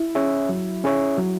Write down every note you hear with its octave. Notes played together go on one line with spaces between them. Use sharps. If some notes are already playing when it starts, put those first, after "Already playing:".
Already playing: E4
C#4 G#4 C#5 E5
F#3
C#4 G#4 C#5 E5
F#3